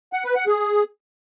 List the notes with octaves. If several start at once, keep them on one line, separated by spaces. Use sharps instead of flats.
F#5
B4
F#5
G#4